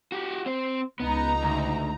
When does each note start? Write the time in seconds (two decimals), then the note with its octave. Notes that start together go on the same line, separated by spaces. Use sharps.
0.12 F#4 G4
0.46 C4 C5
1.00 C#2 B3 D#4 A#5
1.43 D2